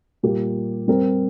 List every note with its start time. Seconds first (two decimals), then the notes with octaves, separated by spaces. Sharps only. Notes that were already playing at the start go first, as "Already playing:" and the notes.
0.23 A#2 G3 A#3 G4
0.88 G3 C4 A#4